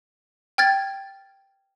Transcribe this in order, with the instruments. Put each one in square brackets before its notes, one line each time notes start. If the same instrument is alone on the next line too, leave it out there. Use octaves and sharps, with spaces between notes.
[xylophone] G5 F6 G#6 A6